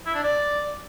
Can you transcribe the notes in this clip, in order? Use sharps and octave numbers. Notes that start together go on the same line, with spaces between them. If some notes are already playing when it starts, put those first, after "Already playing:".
E4
D4
D5